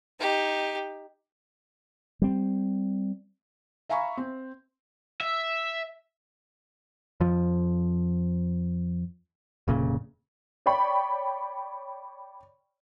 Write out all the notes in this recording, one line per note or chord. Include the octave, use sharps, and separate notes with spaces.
D#4 G4
G3 C4
E5 F5 G#5 A#5 B5 C#6
C4
E5
F2 F3
F1 A#2 C#3
C#5 D5 G5 B5 C#6